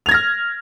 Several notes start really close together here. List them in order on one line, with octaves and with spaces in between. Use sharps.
F7 G#6 A#6 F6